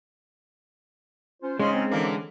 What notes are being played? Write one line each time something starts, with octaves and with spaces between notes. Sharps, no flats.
C#4 F4 C5
G#2 C#3 G#3 C#4 D#5 C6
C4
D3 E3 A#3